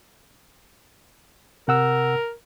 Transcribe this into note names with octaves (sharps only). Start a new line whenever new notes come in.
C3 A#4 F#5 E6